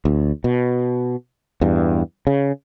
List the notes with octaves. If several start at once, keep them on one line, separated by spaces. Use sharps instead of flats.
D2
B2
E2 G2
C#3